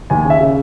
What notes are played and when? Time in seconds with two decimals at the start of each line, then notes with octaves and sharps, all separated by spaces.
0.10 D#2 G#5
0.25 C#3 E5
0.40 C#3